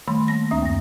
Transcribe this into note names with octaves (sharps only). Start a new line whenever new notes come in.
D#3 G3 A3 B5 C6
A#3 A#6
D2 C4 D4 E5 A#5 D#6
F#2 A#6